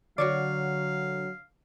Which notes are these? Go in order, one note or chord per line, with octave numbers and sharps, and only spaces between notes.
D3 F#3 F#4 C#5 D5 F5